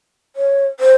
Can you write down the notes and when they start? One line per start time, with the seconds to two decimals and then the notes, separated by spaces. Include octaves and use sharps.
0.36 C#5
0.80 C5